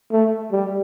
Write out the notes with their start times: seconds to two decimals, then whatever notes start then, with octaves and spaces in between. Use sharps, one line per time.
0.12 A3
0.52 G3